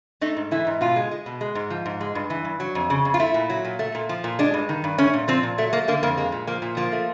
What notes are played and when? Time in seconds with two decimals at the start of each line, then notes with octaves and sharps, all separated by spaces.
0.21 A3 D#4
0.37 G#2
0.51 E3 E4
0.67 G#2
0.81 B2 F4
0.96 G#3
1.11 G#3
1.26 B2
1.41 G#3
1.55 G#2
1.70 F3
1.86 G#2
2.01 G#3
2.15 G2
2.30 E3
2.45 G2
2.60 F#3
2.75 F2
2.90 C#3
3.05 F2
3.14 F4
3.20 A3 E4
3.34 A#2
3.50 F#3
3.65 A#2
3.79 A3
3.95 A#2
4.09 F3
4.24 A#2
4.39 G#3 D4
4.54 G2
4.69 D#3
4.84 G2
4.98 A3 C#4
5.14 A#2
5.28 F3 C4
5.43 A#2
5.58 F#3 A3
5.73 A3 A#3
5.88 D3 A#3
6.03 F2 A#3
6.17 G#3 A#3
6.32 A#2
6.47 F3 A#3
6.62 A#2
6.77 F3 A#3
6.92 A3